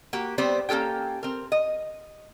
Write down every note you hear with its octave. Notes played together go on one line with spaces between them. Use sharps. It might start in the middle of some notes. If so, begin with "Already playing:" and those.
A#3 F#4 G4
G3 B3 C4 G4 C5 D5
A#3 C#4 G4 A4 G5
C4 A#4
D#5